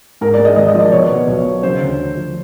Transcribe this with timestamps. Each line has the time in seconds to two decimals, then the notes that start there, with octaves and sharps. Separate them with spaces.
0.21 G#2 A#4
0.34 D5
0.39 G#3
0.45 D#5
0.56 G#1 D#5
0.69 D#5
0.74 F3
0.80 D5
0.92 B2 C#5
1.10 B3
1.28 B1
1.46 F#3
1.63 C#3 C5
1.81 D2
1.98 D2
2.17 F3